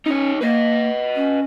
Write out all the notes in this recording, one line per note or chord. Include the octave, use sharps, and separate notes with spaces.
C#4 D#4 C#5
A#3 B4 D#5
C#4